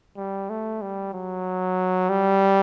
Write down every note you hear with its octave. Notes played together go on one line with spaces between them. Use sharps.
G3
A3
G3
F#3
G3